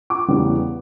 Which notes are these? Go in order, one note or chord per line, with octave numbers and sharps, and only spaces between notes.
D6
E2 C#3 G3 B3